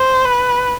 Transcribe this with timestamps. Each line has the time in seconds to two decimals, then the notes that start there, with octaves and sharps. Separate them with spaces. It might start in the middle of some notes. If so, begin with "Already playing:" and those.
Already playing: C5
0.25 B4